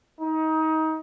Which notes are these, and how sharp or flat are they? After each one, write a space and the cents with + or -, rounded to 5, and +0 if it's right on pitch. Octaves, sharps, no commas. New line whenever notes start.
D#4 +25